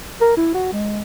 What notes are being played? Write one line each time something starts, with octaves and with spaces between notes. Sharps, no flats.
A#4
E4
F#4
G#3